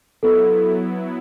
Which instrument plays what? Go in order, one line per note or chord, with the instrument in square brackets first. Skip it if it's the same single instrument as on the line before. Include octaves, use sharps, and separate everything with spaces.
[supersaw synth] F#3 B3 E4 [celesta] A4